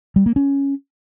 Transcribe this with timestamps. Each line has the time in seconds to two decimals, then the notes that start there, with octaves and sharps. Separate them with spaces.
0.16 G3
0.26 A#3
0.36 C#4